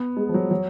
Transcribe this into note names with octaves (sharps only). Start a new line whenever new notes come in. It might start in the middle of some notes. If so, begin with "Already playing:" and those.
Already playing: B3
G#3
F3
F#3
F#3